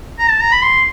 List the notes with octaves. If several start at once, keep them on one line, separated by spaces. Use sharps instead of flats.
A#5
A5
A#5
B5
C6